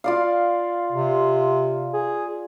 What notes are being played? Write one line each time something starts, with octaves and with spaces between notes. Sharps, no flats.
F4 D5 F5
C3
G#4